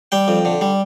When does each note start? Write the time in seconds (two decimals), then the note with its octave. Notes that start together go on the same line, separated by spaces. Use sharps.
0.12 G3 G5
0.28 F2
0.45 D3
0.61 G3